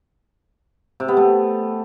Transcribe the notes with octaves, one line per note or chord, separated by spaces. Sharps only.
C3
B3
A3